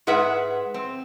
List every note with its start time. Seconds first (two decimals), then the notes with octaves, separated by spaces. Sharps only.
0.07 G#2 G#4 B4 E5 F#5
0.74 C4